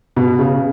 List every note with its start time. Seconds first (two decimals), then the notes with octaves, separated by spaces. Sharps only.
0.16 B2
0.39 C#3